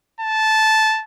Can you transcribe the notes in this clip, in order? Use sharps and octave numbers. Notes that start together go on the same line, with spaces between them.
A5